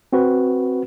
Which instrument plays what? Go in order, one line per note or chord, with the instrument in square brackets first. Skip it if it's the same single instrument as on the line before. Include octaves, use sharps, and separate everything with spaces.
[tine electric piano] C4 F#4 B4